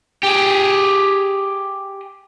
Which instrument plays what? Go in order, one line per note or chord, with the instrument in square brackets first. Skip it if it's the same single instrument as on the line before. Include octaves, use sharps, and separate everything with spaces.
[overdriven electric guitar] G4 G#4